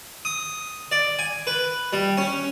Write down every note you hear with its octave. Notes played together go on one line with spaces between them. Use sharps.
D#6
D5
G#5
B4
G3
C#4